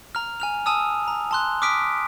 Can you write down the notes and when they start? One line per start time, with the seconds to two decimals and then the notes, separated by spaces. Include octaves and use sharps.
0.15 A#5 F6
0.40 G#5 F6 F7
0.66 G#5 A5 D#6 E6
1.08 A#5
1.31 A5 C6 F#6
1.62 D6 D#6 F6 B6 D7